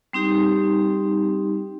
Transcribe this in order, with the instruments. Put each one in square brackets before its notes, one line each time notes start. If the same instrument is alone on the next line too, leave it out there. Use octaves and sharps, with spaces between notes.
[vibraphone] G3 C4 D#4 G4